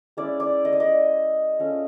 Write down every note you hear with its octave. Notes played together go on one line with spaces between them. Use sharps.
G#3 C#4 E4 D5
D5
D#5
D5
D#5
A3 C#4 F4